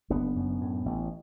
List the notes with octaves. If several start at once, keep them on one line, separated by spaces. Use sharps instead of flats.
F#1 B3 D4
F#2
A2
A1